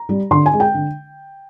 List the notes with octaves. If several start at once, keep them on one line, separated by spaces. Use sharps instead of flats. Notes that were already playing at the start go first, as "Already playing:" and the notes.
Already playing: A#5
G3
D3 C6
G#5
G#3
G5
D3